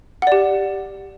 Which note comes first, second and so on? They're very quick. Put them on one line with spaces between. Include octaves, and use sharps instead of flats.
F#5 D5 G4